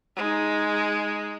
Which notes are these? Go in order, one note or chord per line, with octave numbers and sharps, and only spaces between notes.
G#3 D#4